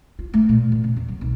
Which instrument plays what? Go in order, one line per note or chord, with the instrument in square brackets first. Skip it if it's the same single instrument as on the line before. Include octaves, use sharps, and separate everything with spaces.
[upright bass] F4
A3
A#2
A#2
C#3
E2
F#3
B1